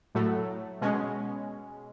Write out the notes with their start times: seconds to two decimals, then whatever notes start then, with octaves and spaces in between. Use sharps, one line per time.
0.15 A2 F#3 A3
0.82 B2 G#3 C#4